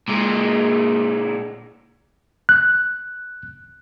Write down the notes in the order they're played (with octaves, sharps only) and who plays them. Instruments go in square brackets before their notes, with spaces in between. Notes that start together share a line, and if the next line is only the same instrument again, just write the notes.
[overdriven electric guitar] A#2 G#3
[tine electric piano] F#6